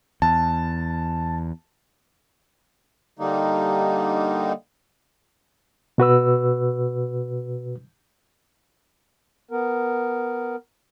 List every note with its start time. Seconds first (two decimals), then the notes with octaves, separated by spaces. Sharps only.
0.22 E2 A5
3.19 D3 G3 A#3 D#4
5.98 B2 F#4 B4 E6
9.51 B3 A#4